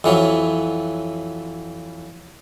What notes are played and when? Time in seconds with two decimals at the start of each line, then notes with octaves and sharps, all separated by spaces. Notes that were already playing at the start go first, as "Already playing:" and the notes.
0.04 F2 E3 F#3